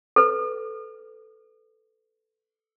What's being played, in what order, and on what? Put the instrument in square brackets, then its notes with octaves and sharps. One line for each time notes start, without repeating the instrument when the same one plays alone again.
[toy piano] A4 B4